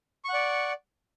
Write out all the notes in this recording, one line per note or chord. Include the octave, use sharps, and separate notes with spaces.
D5 F#5 C#6